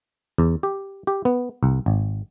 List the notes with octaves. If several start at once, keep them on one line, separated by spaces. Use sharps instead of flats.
E2
G4
G4
B3
C2
G#1